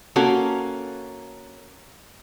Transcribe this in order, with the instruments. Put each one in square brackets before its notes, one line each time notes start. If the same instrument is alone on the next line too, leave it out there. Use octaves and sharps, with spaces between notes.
[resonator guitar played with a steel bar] A#3 C#4 F#4 A4